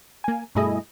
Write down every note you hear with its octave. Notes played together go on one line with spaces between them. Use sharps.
A#3 G#5
G2 B2 A3 E4 G#4 D#5